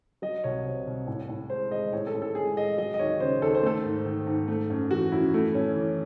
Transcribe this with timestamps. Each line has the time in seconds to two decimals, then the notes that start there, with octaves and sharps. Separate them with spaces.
0.22 F#3 D#5
0.44 C2 C#5
0.65 C3
0.87 C2
1.07 A2
1.29 A2
1.50 G#3 C5
1.71 G#3 D#5
1.93 A2 C#5
2.07 A4
2.14 A2
2.22 A4
2.35 G#3 G#4
2.56 G#3 D#5
2.78 F#3 D#5
2.94 D#5
2.99 D#2 C#5
3.20 C#3 C5
3.42 D#2 A4
3.55 C5
3.63 A3 A4
3.84 G#2
4.05 D#3
4.27 G#2
4.48 A3
4.70 F#2
4.91 E3 F#4
5.12 F#2 E4
5.34 A3 E4
5.54 A2 C#4
5.76 E3